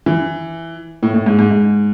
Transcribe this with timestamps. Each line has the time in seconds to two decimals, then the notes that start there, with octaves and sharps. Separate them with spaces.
0.06 E3
1.03 A2
1.14 A2
1.26 G#2
1.39 G#2
1.51 G#2